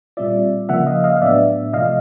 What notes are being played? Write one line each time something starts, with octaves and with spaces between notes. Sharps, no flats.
A#2 G3 C4 F4 D5 E5
C#3 F3 A#3 E5 F#5
D#5 F5
D#5 F5
F5
A2 F#3 B3 D4 D5 E5
C3 F3 A3 D#5 F5